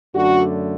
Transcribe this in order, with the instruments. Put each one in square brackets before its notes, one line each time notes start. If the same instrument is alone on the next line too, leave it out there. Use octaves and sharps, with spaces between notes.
[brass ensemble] F#2 D3 A3 D4 F#4